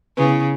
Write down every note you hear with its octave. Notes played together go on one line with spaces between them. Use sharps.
C#3 B3 E4 B4